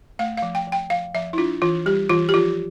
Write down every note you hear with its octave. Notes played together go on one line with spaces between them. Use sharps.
A3 F5
F5
F3
G5
F3
G5
F3 F5
F3 E5
E4
D4 F4
E3 F4
G3 G4
E3 F4
G4
F3 F4